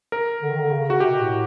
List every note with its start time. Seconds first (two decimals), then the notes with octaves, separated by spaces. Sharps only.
0.12 A#4
0.42 D3
0.51 D#3
0.59 D3
0.71 C#3
0.90 F#4
1.00 C3 G4
1.10 B2
1.19 A2